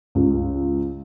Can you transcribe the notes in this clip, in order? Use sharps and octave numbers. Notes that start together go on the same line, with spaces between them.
C#2